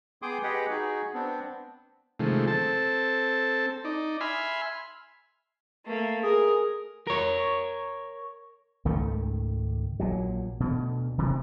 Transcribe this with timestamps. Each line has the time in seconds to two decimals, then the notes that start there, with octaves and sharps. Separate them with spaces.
0.22 B3 G#4 G5 C6 D6 D#6
0.43 G4 G#4 B4 D#5 F#5 G5
0.70 D#4 F#4 G#4
1.14 B3 C4 D4
2.20 C3 D#3 F3 G#3 A3
2.47 C4 A4 A5
3.85 D#4 D5
4.21 E5 G#5 B5 C6 F6
5.85 A3 A#3
6.24 G#4 A#4
7.07 A#4 C#5
8.85 G#1 C#2 D#3 A3
10.00 A#1 A#2 F#3
10.60 D2 B2
11.18 D1 C3 D#3